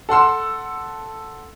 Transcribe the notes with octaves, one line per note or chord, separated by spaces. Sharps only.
A4 F#5 C6 E6